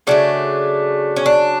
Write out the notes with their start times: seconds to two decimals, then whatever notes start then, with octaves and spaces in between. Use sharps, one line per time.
0.07 C#3 F#3 A3 D4
1.16 C#4
1.26 D4